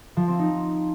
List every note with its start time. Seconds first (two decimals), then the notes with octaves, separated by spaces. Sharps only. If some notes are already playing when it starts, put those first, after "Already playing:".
0.17 F3
0.28 C4
0.39 D#4